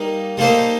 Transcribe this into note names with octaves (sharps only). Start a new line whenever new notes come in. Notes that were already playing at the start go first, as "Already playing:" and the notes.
Already playing: G3 A#3 D#4
G3 A#3 D#4 A4 C5